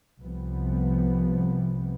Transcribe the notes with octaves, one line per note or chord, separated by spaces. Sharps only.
C2 C3 F3 B3